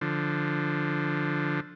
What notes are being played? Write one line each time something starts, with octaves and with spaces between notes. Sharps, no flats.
D3 F3